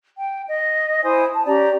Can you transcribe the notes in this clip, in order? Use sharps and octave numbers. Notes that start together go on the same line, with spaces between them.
G5
D#5
E4 C5 G#5 D#6
A5
C#4 G4 D5 A#5